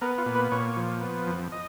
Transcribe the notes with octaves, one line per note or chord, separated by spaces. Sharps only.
B3 A#4
F4
A#2
B4
A#2 C#5
F3
B3
F2
D#5